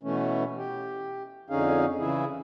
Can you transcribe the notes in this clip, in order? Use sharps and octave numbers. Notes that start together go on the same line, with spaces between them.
B2 E3 A3 C#4
G4
F2 D3 C#4 D#4 G#4 F5
C#3 E3 E4 G#4